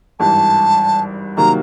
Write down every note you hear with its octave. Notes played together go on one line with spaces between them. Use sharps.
G#1 G2 E3 A5
C3 D#3 F#3 A#3 A#5